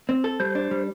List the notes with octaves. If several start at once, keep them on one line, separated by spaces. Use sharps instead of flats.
C4
A4
G3 C5
D4
G3